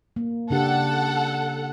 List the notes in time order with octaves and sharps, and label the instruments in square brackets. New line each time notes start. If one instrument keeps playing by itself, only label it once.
[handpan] A#3
[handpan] C#3 D4 G4 [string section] A4 F#5